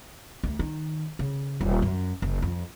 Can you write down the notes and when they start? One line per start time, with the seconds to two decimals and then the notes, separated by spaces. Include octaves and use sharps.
0.43 D2
0.59 D#3
1.19 C#3
1.61 D#1
1.82 F#2
2.22 F#1
2.42 F2